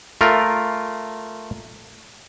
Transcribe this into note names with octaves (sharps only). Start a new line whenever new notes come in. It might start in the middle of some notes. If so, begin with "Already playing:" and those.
A3 F4 A#4